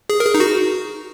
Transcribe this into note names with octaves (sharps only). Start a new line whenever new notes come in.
G#4
A#4
G#4
D#4
F#4